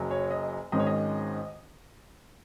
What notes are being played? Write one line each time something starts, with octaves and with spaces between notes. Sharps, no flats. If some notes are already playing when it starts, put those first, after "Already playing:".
Already playing: F#1 F#2 F#3
C#5
D#5
G#1 G#2 D#3 G#3 C#4 D#5
C#5
D#5